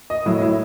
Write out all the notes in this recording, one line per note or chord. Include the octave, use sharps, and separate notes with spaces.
D#5
A2 F#3 E4
E4